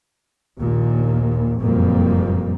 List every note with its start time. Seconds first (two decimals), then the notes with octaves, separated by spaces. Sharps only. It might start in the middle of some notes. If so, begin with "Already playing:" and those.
0.59 A#1 D#2 A#2
1.61 F#1 F2 A#2 G3 A#3